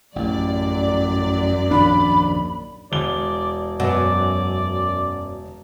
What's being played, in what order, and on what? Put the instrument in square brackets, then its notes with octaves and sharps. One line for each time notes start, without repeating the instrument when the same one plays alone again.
[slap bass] A1 [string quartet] F#2 [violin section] D5
[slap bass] A#1 D#2 D4 [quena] B5
[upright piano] E1 G7 [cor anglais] D5
[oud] F#2 [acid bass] B2 [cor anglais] D5